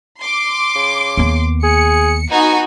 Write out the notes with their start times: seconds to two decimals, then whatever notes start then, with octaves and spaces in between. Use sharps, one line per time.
0.21 C6 D6
0.75 C#3
1.17 D#2 B3
1.63 G#4 C#7
2.31 B3 D#4 F#4 G#5